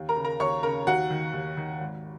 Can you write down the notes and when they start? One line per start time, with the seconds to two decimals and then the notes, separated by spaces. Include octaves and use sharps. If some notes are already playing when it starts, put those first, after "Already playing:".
Already playing: D#2
0.09 A#4 A#5
0.16 C#3
0.24 A#4 A#5
0.40 D#2 C#5 C#6
0.63 C#3 A#4 A#5
0.87 D#2 F#4 F#5
1.10 D#3
1.33 D#2
1.57 D#3
1.80 G#1